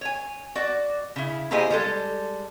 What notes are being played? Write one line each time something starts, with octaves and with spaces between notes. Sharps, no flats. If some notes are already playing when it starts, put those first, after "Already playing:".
C#5 G#5
F#4 D5
C#3 E4
A#3 E4 G4 G#4 C5 D#5
G3 G#3 A4